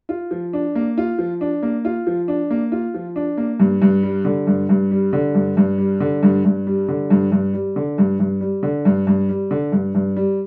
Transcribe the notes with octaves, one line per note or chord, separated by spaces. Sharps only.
F4
F3
D4
A#3
F4
F3
D4
A#3
F4
F3
D4
A#3
F4
F3
D4
A#3
G2
G2
G3
D3
G2
G2
G3
D3
G2
G2
G3
D3
G2
G2
G3
D3
G2
G2
G3
D3
G2
G2
G3
D3
G2
G2
G3
D3
G2
G2
G3